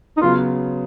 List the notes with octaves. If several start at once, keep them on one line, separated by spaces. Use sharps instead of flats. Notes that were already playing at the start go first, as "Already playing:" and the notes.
D#4
C#3 F#3 B3 F4